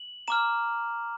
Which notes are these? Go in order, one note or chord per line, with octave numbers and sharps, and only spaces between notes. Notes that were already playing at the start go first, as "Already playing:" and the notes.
Already playing: F#7
A#5 D6 F6 E7